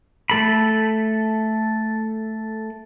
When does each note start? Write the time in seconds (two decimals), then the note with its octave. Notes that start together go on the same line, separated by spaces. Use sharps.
0.30 A3 A4 B5